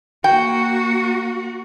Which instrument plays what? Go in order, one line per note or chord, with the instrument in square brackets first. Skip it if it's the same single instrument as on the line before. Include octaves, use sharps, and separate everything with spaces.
[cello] A#3 F#4 [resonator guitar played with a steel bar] G5